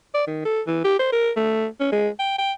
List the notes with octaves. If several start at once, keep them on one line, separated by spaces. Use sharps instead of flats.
D5
D#3
A4
E3
G4
C5
A#4
A3
C#4
G#3
G5
G5